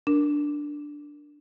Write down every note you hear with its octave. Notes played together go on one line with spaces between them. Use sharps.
D4 A#4